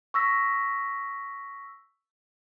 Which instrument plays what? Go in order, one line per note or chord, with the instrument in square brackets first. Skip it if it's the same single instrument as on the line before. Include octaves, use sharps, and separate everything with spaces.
[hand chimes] C#6 E6 A#6 B6